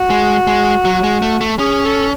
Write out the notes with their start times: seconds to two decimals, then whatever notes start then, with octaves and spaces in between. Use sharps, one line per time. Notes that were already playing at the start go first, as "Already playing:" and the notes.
Already playing: F#4
0.10 G#3
0.47 G#3
0.85 F#3
1.04 G#3
1.22 A3
1.41 A3
1.59 C#4 G#4
1.85 A4